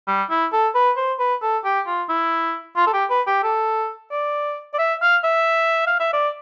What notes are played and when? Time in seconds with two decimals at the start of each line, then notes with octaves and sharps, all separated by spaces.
0.07 G3
0.30 E4
0.52 A4
0.75 B4
0.97 C5
1.19 B4
1.42 A4
1.64 G4
1.87 F4
2.09 E4
2.76 F4
2.87 A4
2.93 G4
3.10 B4
3.27 G4
3.43 A4
4.11 D5
4.74 D5
4.78 E5
5.01 F5
5.24 E5
5.87 F5
6.00 E5
6.13 D5